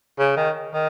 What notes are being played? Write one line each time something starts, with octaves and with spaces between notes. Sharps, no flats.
C#3
D#3
D#3